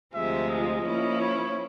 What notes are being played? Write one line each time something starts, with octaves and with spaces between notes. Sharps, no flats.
D2 C3 F3 G#3 E5
D#5
F3 A#3 C#4 E4
C#5